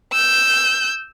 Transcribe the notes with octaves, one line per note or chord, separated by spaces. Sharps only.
E6 G6